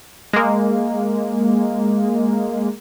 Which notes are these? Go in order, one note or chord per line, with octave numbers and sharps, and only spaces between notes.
G#3 A#3